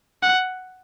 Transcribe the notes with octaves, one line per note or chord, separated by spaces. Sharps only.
F#5